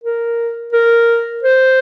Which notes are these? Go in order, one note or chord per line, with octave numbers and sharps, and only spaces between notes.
A#4
A#4
C5